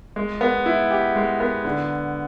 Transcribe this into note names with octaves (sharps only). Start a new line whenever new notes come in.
G#3
B3
E4
G4
G#3
B3
D3